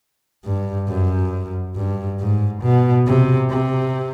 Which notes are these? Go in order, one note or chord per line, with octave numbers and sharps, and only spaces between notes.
G2
F#2
G2
G#2
B2
C3
C3